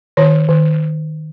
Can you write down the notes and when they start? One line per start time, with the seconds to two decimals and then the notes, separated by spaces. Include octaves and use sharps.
0.17 D#3 C#5
0.49 D#3